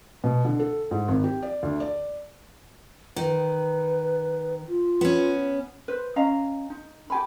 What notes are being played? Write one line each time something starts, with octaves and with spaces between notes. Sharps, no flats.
B2
D3
A4
G#2
G#1
G4
D5
D2
D5
D#3 B4
F4
B3 C#4
B4 C5
C#4 D#5 F5 A#5
D#4
G4 G#5 B5